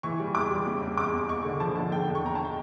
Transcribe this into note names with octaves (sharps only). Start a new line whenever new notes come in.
E3 C#6
G3
E2 D6
G3
C#3
E2
E2 D6
E2
E2 C#6
D3
F3 A5
D3 A5
D3 G5
E2
C#6
E2 A#5
A5
G5